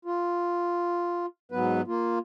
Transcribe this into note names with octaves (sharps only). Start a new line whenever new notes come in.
F4
G#2 F#3 B3 B4
A#3 F4